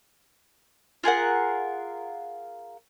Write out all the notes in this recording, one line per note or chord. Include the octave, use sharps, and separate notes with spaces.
F4 G#4 A#4 F#5